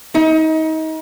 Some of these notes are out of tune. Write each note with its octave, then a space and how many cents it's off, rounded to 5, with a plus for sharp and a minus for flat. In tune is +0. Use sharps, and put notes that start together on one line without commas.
D#4 +30